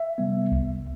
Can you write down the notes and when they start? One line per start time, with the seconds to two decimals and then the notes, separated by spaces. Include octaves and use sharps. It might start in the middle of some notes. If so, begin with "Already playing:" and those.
Already playing: E5
0.18 C3 G3 B3
0.52 C2